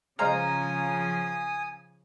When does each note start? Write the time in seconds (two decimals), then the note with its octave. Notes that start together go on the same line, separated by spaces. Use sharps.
0.19 C#3 F3 G#3 C5 F5 G#5 A#5 D#6